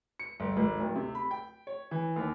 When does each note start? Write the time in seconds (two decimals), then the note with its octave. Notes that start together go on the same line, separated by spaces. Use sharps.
0.19 C#7
0.40 G1
0.57 G#1
0.80 D1
0.96 C3
1.15 B5
1.31 G5
1.67 C#5
1.91 E3
2.16 D#2